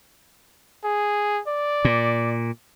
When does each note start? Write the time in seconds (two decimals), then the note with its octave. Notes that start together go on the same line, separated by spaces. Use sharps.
0.84 G#4
1.48 D5
1.85 A#2